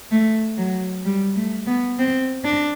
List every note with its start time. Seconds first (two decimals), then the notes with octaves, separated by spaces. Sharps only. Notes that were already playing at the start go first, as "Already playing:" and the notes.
0.12 A3
0.58 F#3
1.05 G3
1.36 A3
1.67 B3
1.99 C4
2.45 D4